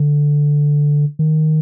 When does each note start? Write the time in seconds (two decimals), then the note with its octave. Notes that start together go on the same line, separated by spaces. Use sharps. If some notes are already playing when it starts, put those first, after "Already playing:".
Already playing: D3
1.19 D#3